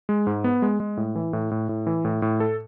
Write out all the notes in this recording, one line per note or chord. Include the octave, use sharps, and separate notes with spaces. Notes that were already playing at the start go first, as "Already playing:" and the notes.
G#3
G#2
B3
G#3
G#3
A2
E3
A2
A2
A2
E3
A2
A2
A4